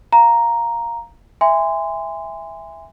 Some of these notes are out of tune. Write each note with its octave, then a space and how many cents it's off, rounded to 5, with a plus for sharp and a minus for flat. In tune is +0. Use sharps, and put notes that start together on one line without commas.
F5 +0 A#5 +0
E5 +0 G#5 -25 C6 -20